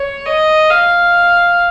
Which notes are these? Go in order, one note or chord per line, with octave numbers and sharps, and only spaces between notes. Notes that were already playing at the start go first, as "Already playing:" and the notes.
Already playing: C#5
D#5
F5